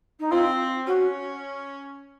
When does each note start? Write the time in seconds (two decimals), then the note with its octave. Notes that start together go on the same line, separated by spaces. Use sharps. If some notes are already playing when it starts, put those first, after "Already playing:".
0.19 D#4
0.31 C4 F4
0.86 C#4 F#4